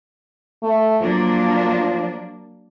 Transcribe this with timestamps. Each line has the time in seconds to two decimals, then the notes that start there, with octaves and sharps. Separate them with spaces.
0.63 A3
1.02 F3 F#3 A#3 D4